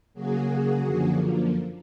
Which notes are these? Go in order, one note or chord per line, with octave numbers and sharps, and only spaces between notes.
C#3 F#3 A#3 F#4 G#4
F#2 D3 F3 A#3